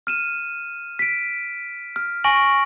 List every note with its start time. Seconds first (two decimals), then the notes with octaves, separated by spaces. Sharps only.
0.07 F6 D#7 E7
0.99 B6 D7
1.96 F6
2.24 G#5 C#6 A#6 D7 F#7